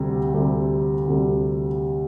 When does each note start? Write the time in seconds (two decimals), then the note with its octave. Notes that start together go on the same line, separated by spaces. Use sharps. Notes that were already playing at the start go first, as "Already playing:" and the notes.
Already playing: D2 C3 G3
0.33 D2 C3 G3
1.07 D2 C3 G3